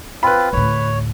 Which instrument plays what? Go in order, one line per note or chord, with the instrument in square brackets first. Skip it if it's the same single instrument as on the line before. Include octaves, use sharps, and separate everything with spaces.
[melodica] C4 F4 [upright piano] B4 B5
[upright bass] D2 A2 [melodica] C#5